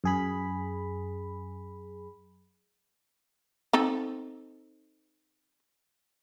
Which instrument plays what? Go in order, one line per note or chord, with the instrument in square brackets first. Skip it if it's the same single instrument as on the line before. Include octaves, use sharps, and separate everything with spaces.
[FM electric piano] F#2 G#4 B5
[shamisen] C4 D#4 A4